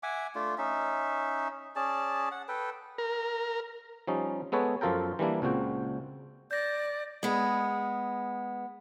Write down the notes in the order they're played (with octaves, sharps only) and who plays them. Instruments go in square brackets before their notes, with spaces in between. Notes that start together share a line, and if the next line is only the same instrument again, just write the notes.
[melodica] E5 F#5 G#5 D6
A3 D4 F4
C#4 D#4 E5
C#4 G#4 D5 A5
F#5
A4 B4 G5
[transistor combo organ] A#4
[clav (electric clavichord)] F3 G3 C#4 D#4
G#3 B3 A4 B4 C#5
F#2 F3 F4 A4 A#4 G5
E3 G3 A#3 D4 E4
C#2 A#2 C4 F#4 G5
[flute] D5 [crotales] G6 A#6
[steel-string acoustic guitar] G#3 B3